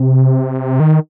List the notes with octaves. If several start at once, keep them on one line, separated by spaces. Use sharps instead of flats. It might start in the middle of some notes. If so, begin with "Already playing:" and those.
Already playing: C3
D#3